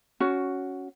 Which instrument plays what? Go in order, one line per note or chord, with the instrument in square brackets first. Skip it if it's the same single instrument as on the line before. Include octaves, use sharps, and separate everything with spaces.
[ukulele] C#4 F#4